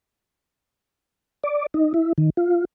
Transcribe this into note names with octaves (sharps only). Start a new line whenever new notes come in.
D5
D#4
E4
D#3
F4